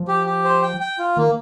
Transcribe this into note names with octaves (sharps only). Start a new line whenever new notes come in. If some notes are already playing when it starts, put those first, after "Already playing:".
Already playing: F3
G4
G4
C5
G5
G5
F4
D#3 A#3